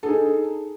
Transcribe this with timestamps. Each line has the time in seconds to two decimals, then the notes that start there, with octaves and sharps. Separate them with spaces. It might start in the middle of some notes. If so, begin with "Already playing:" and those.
0.03 A4
0.06 G#4
0.08 D#4